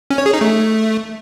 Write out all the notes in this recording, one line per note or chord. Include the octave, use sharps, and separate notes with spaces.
C#4
C#5
G#4
D#4
A3